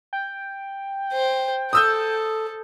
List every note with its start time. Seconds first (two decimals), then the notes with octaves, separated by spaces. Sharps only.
0.13 G5
1.13 C5
1.73 A4 D#6 E6 G6